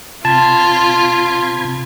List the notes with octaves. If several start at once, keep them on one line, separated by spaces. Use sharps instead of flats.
C3 F4 A5 B5 G#6